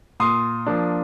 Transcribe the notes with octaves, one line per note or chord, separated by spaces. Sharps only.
A#2 C6 D#6
F3 A#3 D4